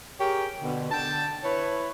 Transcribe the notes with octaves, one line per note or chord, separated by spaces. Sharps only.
G4 G#4 A#4 C#5 G5
B2 D3
D3 G5 A5
E4 B4 C#5